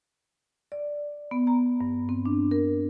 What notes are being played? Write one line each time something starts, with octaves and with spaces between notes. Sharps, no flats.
D5
B3
A#5
G2
C4
D4
A#4